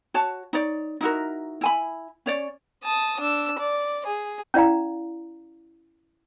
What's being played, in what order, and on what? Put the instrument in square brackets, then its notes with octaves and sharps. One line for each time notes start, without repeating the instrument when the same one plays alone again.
[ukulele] F#4 C#5 A5
D#4 C#5 D5
D#4 E4 F#4 A#4
E4 G#5 B5
C#4 C#5 D5
[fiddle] A5 D#6
D4 E6
D5
G#4
[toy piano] C#4 E4 D5 F5 A#5